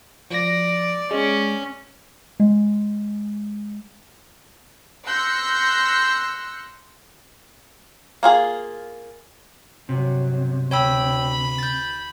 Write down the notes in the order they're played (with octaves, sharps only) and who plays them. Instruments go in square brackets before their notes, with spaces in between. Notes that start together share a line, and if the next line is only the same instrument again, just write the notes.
[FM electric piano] F3 A#6 [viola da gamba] D5
[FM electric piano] G#3 [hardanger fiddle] C#4
[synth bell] G#3
[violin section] C6 E6 F#6 G6 A#6 C#7
[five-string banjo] A#3 F4 G#4
[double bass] G1 F#3 [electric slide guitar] C3
[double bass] D2 [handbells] C#5 G5 E6 [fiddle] B5
[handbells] G6 A6